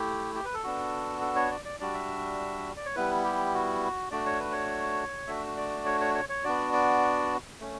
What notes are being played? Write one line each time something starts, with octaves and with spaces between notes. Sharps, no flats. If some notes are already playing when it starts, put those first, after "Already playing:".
Already playing: A3 E4 G4
G4
B4
A4
B3 D4 F#4
A4
C#5
D5
D5
G3 D4 F#4 D5
E5
D5
C#5
G3 B3 E4 B4
G4
F#4
A3 D4 F#4 D5
C#5
B4
C#5
A3 D4 F#4 E5
D5
C#5
C#5
C#5
C#5
B3 D4 F#4 D5
D5
A3 C#4